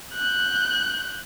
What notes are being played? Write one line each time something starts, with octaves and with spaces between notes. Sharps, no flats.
F#6 G6